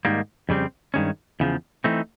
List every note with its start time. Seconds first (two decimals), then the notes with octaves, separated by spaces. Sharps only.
0.05 G#2 D#3 G3 A#3
0.49 F2 C#3 G3 C4
0.94 G2 D#3 G#3 C#4
1.40 E2 C#3 F3
1.84 E3 A3 C4 D#4